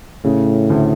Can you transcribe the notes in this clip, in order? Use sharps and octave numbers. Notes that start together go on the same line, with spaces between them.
A2 C#3
D2